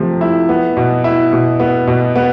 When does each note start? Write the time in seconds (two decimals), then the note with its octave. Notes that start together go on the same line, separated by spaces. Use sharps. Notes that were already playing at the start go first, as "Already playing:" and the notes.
Already playing: C3 F3 A3
0.21 E4
0.49 B3
0.77 B2
1.04 E4
1.33 B2
1.60 B3
1.87 B2
2.16 B3